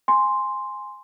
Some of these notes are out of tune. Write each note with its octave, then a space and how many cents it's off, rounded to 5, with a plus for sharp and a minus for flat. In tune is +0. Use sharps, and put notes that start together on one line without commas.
G#5 +0 C6 +0